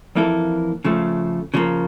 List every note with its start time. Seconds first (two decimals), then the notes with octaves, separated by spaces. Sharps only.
0.15 F2 E3 A#3 E4 A4
0.85 C#3 F3 A3
1.54 C#3 F3 A#3